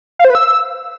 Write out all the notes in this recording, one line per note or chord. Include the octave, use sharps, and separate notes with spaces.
F5
C5
B4
E6